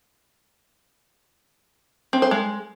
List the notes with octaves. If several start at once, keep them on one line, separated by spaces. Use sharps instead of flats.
C4
C5
G#3